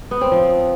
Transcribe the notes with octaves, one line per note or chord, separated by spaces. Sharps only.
B3
C4
F3